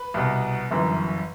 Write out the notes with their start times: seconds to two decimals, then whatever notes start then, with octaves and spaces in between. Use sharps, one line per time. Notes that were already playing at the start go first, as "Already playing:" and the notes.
Already playing: B4
0.14 C2 B2
0.71 G1 F#2 E3